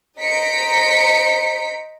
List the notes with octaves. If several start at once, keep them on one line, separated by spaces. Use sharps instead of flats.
C5 D#5 A#5 B6 C#7 D7